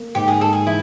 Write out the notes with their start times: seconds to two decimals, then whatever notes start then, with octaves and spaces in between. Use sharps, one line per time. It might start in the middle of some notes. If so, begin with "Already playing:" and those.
Already playing: A#3
0.15 G#2 G4
0.28 G#4
0.40 G#2 A4
0.53 G#4
0.66 E3 E4